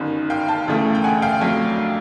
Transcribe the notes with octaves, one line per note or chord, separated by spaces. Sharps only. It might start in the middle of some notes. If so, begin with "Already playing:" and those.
Already playing: G1 F#2 D#3
F5 G5
G5 A5
E1 D2 C#3 E3 A3
G5
F#5 G#5
F5 G5
F2 D3 F#3 A3